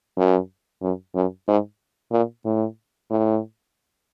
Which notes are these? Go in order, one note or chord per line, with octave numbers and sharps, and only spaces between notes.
F#2
F#2
F#2
G#2
A#2
A2
A2